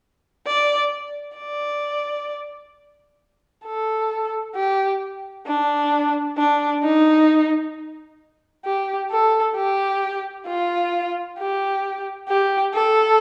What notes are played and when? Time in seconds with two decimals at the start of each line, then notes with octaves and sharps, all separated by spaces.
0.47 D5
1.37 D5
3.65 A4
4.56 G4
5.47 D4
6.38 D4
6.83 D#4
8.65 G4
9.10 A4
9.55 G4
10.47 F4
11.38 G4
12.29 G4
12.74 A4